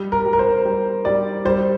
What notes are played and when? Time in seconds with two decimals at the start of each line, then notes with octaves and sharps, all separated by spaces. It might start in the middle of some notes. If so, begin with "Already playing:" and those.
Already playing: G3
0.12 A#4
0.26 G3
0.33 A#4
0.39 C5
0.65 G3
1.05 G3 D5
1.45 G3 C5